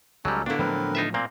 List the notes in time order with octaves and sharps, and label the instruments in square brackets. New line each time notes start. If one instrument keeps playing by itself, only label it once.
[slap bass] C#2 [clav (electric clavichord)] F#3 G3 [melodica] C#4 D#4 A4
[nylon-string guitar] D3 B3 [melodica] A#3 F#4 [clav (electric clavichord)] D4 E4
[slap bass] A2 F3 F#3 [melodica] C4 A#4 B4
[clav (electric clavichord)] D#4 F4 E5
A#2 A#3 C4